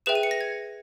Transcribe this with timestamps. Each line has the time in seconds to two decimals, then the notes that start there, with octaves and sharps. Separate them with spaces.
0.06 G#4 B4 E5 G5 E7
0.15 D#7
0.23 C#7
0.31 A#6
0.41 G#6